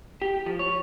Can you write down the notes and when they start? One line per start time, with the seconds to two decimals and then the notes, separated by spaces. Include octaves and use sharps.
0.22 G4
0.46 F3
0.59 C#5